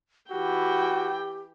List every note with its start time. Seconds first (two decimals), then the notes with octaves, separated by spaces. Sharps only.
0.31 E3 F#4 G4 G5